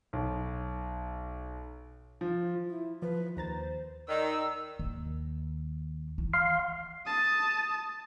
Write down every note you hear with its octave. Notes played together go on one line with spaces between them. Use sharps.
B1
F3
E4
F3 B4
D#2 C5 A#5 A6
D#3 D5 E6
D#2
E3
F5 C6
A5 D#6